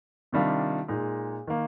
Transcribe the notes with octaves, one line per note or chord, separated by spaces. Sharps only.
C3 D#3 G3 D4 F4
A#2 G#3 D#4
D#3 A#3